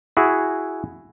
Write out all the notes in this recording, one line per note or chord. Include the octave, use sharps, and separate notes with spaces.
E4 F#4 G#4